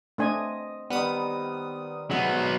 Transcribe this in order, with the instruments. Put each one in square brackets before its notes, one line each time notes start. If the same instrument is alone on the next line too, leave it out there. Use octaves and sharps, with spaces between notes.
[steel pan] A3 D4 G#5 [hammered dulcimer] C4 D#5
[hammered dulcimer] D#3 G3 [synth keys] B3 B4 D#6
[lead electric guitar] F#3 B3 [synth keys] G#3 E5